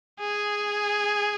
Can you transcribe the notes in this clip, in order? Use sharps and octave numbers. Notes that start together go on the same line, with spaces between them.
G#4